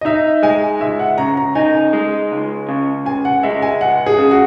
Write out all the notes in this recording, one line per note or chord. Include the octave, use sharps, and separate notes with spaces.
D#5
D#4 E5
G#3 G#5
C#2 E5
F#5
C#3 A#5
A#5
D#4 G#5
G#3
C#2
C#3
C#2 G#5
F#5
G#3 E5
G#5
C#2 F#5
G#4
C#3
F#4